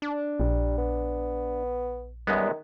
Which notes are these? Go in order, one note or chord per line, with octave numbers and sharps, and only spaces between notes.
D4
A#1 G3
B3
F#2 D#3 G3 G#3 B3